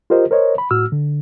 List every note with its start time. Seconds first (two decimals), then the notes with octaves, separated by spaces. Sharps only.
0.10 F4 G4 A#4 C5 D#5
0.31 A#4 C5 C#5 D#5
0.58 B5
0.71 A2 F#4 E6 F6
0.92 D3